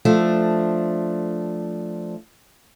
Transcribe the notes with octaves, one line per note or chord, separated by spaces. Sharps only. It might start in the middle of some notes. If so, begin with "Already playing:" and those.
F3 A3 D4